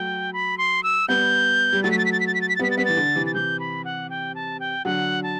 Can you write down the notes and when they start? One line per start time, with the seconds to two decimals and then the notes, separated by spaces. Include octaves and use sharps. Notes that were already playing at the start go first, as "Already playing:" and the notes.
Already playing: F#3 A3 G5
0.33 B5
0.58 C6
0.83 E6
1.08 G3 B3 G6
1.73 G3
1.83 F#3 A3 A6
1.91 B6
1.98 A6
2.05 B6
2.12 A6
2.20 B6
2.27 A6
2.34 B6
2.41 A6
2.49 B6
2.56 A6
2.59 G3 B3 B6
2.71 A6
2.78 G3 B3 B6
2.85 E3 A6
2.97 D3
3.15 C3 E3
3.26 A6
3.34 C3 E3 G6
3.60 B5
3.85 F#5
4.10 G5
4.35 A5
4.60 G5
4.85 D3 F#3 F#5
5.23 A5